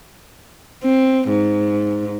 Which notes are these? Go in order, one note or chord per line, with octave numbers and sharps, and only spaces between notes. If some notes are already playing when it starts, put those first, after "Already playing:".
C4
G#2